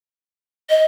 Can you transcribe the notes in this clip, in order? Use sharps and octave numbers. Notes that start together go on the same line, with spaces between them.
D#5